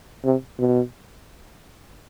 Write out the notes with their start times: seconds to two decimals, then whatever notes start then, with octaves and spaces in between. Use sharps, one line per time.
0.25 C3
0.60 B2